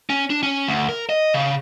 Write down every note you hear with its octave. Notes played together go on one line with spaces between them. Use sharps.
C#4
D4
C#4
D2
A#4
D#5
C#3